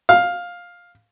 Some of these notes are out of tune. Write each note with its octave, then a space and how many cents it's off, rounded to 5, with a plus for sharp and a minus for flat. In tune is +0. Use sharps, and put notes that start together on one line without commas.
F5 +10